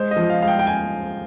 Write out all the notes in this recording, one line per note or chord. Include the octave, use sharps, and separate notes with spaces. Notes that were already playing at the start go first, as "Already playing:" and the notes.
Already playing: G#3 C5
D#5
F3
F5
G#3 F5
G5
G5
G#5